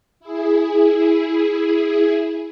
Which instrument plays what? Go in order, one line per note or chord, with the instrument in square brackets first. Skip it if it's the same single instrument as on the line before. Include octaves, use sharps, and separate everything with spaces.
[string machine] E4 G#4